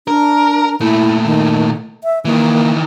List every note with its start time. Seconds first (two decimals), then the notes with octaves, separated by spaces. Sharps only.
0.07 D4 A#4
0.80 A#2 A3 E4
1.25 D#3
2.04 E5
2.25 D#3 E3 A#3